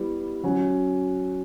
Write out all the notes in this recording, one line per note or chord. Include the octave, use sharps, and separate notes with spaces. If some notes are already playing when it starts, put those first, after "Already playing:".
Already playing: G3 B3 E4
F#3 C#4 F#4